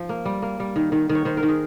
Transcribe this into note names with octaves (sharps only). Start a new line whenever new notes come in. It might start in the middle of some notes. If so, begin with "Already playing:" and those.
Already playing: F3
A#3
G3
A#3
G3
D#3
D#3
D#3
C#5
D#3 C5
A#4
D#3
G#4